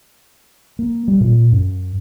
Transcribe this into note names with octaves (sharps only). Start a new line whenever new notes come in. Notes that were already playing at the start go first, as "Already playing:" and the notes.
A#3
G3
A#2
F#2